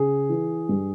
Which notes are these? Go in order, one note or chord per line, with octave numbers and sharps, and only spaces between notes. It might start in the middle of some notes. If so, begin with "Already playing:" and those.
Already playing: C#3 G#4
E3
G2